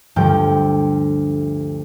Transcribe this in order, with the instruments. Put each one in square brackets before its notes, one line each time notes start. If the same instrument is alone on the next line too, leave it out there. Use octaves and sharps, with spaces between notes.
[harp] D2 G2 F3 G5